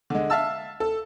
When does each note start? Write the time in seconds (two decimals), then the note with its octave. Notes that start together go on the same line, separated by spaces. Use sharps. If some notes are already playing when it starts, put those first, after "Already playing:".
0.10 D3 G#3
0.30 E5 F5 A5 E6
0.80 A4